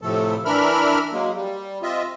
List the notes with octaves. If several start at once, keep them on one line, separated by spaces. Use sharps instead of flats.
A2 C3 F3 A3 A4
E3 D4 A#4 E5 B5 F6
F#3 G#3 A#3
G3
C4 F4 D#5 E5